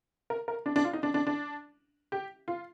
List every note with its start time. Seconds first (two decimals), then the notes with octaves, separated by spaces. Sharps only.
0.30 A#4
0.48 A#4
0.66 D4
0.76 D4
0.85 F4
0.93 D#4
1.03 D4
1.14 D4
1.27 D4
2.12 G4
2.48 F4